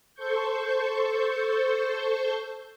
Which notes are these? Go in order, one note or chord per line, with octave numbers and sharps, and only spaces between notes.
A4 C5 C#6 G6